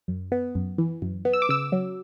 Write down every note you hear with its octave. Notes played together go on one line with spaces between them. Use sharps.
F#2
B3
F#2
E3
F#2
B3
E6
D6
C#3 E6
F#3